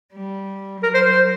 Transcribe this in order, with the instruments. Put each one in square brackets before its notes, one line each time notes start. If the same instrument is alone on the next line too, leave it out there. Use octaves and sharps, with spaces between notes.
[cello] G3
[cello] F#3 [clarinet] A#4
[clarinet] C5
C5